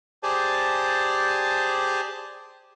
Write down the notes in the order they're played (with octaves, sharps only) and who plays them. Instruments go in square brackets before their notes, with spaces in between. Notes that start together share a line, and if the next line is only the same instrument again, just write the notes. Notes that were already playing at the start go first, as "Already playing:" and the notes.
[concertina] G4 G#4 C5 D5 G#5 A5